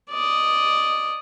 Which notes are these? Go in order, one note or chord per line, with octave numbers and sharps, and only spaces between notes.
D5 D#5